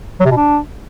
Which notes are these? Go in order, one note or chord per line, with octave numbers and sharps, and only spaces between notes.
F#3
C3
B2
D4